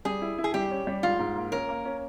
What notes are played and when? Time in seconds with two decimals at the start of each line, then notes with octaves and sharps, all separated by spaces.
0.05 G3 G#4
0.22 E4
0.38 E4
0.44 G#4
0.54 G3 G4
0.71 C#4
0.87 G3
1.03 G#2 F4
1.19 G#2
1.36 A#3
1.52 C#4 A#4
1.69 A#3
1.85 C#4